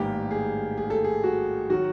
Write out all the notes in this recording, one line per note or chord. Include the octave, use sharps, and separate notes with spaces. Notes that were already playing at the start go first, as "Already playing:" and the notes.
Already playing: A1 G#2 D#3 G3 A#3 G4
G#4
G#4
A4
G#4
F#4
D#3 F#3 F#4